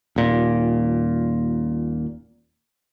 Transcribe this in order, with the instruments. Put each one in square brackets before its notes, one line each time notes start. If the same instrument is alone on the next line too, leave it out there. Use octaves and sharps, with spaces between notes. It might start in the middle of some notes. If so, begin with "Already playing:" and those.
[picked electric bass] D#1 A#2